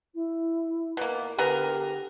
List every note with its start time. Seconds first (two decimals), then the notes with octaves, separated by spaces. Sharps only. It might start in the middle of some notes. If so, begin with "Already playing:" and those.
0.14 E4
0.97 B2 A#3
1.39 D3 B3 G4 G#4 A#4